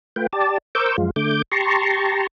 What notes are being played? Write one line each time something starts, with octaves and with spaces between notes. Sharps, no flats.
A3 F4 B4 G5
G4 D5 A5
A#4 C5 C#6 D6 E6 G6
F#2 F3 G#3 F4
D3 A3 D6 G6
G4 A5 A#5 C6 C#6